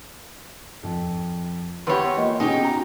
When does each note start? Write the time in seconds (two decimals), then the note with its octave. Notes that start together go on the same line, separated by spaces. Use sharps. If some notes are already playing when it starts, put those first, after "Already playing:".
0.83 F2
1.87 E2 G4 B4 C#5 C6
2.17 A#3 F4 D#5
2.40 B2 C#4 D#4 G4 G#4 G#5
2.64 F#4 A#5